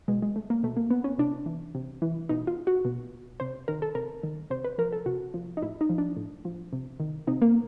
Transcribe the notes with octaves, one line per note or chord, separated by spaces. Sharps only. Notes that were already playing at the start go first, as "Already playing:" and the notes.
B2 G#3
G#3
A3
A#3
B2 A3
A#3
B3
C#4
C3 D4
E3
C3
E3
B2 D#4
F4
F#4
B2
C3 C5
D#3 A#4
A4
C3 A#4
D#3
C3 C5
B4
F3 A#4
A4
C3 F#4
F3
D#4
A2 E4
D#4
F3
D4
A2
F3
C3
D#3
C3 D#4
A#3